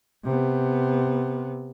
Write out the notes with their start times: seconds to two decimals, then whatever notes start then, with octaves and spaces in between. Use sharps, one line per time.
0.24 C3 B3